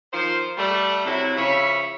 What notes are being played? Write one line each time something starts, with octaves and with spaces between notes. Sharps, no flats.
D#3 F3 C5
G3 A3
C3 F#3 E4
C#3 F3 C#5 E5 B5